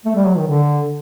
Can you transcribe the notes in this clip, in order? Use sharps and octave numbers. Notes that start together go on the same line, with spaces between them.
A3
G3
F#3
D#3
D3